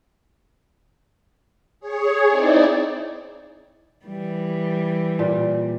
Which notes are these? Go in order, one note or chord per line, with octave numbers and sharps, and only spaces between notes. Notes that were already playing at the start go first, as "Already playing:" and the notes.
G#4 C#5
C4 D#4 E4 D5
E3 G3
A#2